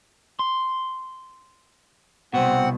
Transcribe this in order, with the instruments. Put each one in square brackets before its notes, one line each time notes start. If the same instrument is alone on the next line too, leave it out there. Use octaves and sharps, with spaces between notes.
[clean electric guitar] C6
[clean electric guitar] C2 B2 [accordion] C4 F#5